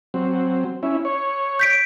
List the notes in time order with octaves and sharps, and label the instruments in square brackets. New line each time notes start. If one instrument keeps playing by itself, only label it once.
[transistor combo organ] F#3 C4
C#4 E4
C#5
[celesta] G6 B6 D7